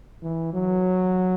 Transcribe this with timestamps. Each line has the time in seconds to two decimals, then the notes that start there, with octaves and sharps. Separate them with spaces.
0.22 E3
0.53 F#3